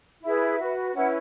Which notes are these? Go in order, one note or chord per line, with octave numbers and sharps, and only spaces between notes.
E4 G#4 B4 E5
F#4 B4
C#4 E4 B4 F#5